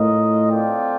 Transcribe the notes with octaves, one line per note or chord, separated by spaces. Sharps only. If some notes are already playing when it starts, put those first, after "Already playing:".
Already playing: A2 F4 A#4 D#5
C4 F4 A4 D5 G5